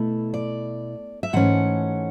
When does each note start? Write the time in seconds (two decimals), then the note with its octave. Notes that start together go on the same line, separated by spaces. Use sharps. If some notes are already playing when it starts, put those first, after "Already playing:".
Already playing: B2 A3 E4
0.34 D5
1.23 E5
1.33 G#2 E3 A3 C#4 F#5